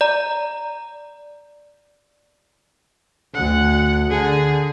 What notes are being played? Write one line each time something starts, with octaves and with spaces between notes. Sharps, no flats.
D5 A#5
D2 F#5
D3 G#4